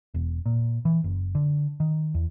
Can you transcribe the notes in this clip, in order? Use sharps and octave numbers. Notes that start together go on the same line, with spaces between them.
E1
A#2
E3
F#1
D3
D#3
E2